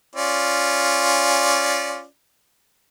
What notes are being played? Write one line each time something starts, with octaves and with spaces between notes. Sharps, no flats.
C#4 F4 D5